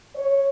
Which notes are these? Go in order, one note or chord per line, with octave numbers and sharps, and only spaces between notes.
C#5